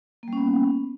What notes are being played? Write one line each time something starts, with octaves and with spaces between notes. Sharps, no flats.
G3 A#3 B3 C#4